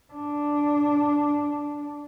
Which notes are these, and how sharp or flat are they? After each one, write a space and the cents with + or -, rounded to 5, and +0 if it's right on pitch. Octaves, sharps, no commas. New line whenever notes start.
D4 -5